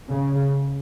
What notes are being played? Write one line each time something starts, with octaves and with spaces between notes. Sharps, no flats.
C#3